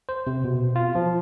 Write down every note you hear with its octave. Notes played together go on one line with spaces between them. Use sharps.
C5
C3
B2
F4
F3